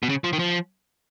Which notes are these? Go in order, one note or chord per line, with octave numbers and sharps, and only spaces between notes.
B2
C#3
F3
D#3
F3